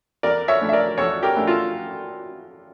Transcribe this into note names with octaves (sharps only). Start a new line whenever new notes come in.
E2 A#4 D5
C#5 E5
E3 A3 D4
E5
A#4 D5
E2 A4 C#5
G4 A#4
E3 A3 D4
F4 A4